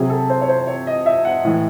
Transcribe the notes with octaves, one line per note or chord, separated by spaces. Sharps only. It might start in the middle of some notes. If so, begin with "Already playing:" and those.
Already playing: C3 F#3 G#4
A4
C5
C#5
C5
C#5
D#5
E5
F#5
A2 E3